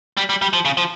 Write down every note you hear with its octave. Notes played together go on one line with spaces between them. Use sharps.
G3
G3
G3
F3
C#3
F3